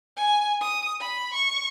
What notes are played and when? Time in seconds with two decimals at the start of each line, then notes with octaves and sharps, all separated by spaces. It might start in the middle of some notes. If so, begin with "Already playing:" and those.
0.16 G#5
0.61 D#6
1.00 B5
1.34 C#6